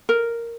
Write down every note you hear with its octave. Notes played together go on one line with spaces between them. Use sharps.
A#4